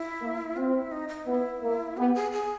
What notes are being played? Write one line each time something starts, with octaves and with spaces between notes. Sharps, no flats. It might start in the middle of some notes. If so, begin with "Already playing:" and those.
Already playing: E4
A#3
C4 F4
E4
D#4
D#4
B3 E4
A#3
B3 G4
G#4
G#4